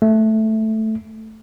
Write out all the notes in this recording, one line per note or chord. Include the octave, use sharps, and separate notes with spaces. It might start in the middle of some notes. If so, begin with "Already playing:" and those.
A3